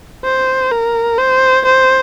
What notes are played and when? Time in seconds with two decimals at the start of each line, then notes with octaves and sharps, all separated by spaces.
0.25 C5
0.71 A#4
1.18 C5
1.66 C5